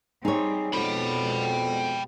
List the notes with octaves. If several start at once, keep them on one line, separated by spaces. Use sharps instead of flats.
G3 C4 D#4 G#4 C#5
F2 B2 G#3 G5 B5